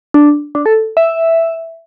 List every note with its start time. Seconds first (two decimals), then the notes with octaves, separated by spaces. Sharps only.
0.14 D4
0.55 D4
0.66 A4
0.97 E5